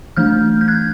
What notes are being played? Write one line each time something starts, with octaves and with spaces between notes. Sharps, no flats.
E3 A3 D4 F6 G6
G6
F#6 G#6